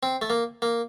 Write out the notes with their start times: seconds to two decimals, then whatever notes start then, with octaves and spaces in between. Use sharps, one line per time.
0.03 C4
0.22 A3
0.30 A#3
0.62 A#3